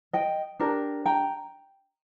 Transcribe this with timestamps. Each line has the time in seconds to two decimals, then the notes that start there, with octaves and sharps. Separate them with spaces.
0.13 D#5 G5
0.59 D4 G4 A#4
1.06 G5 A#5